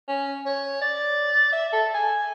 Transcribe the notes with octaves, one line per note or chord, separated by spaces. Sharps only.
C#4
C#5
D5
E5
A4
G#5